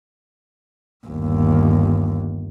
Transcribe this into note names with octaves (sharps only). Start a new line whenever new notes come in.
G1 D#2